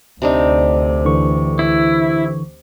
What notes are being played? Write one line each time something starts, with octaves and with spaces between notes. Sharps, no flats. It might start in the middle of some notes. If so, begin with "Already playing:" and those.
D2 C3 D4 D#4
D3 E3 C#6
E4